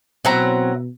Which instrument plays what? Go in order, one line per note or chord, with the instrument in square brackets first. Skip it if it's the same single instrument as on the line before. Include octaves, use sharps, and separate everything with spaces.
[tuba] B2 [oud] F#3 C4 [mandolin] E4 F#5 A#5